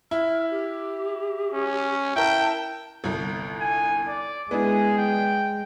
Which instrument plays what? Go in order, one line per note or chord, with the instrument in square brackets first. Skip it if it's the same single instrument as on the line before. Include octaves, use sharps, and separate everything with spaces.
[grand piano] E4 [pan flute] F6
[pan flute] G4
[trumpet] C#4
[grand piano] E4 A#4 [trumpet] G5 [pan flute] A5
[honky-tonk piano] G1 C2
[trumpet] G#5
D5
[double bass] G#3 [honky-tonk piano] B3 D4 E4 [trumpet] G#4
[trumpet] G5